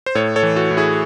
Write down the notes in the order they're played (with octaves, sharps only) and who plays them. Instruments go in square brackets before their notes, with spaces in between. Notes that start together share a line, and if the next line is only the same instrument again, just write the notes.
[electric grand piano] C5
A2 A4 C#5
A4 C#5
E3
F#4 A4
A2
E4 G#4